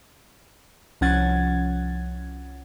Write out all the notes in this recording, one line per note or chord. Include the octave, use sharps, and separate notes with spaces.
C2 F3 C#4 F#5 G#6 A6